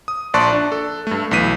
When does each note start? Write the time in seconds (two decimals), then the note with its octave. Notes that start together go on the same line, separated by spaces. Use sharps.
0.08 D#6
0.34 A#1 D5 A5 C6 C#6 F#6
0.53 D4
0.72 A4
1.07 G2 A3
1.31 B1 E3 B6 D#7